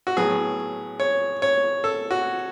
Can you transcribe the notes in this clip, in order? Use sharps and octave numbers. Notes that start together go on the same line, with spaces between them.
F#4
A2 F#3 B3 G#4
C#5
C#5
A4
F#4